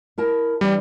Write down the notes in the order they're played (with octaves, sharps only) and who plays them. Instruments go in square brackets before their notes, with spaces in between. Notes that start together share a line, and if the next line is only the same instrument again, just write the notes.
[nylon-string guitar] E4 A#4 A5
[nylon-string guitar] E3 D4 [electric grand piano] G3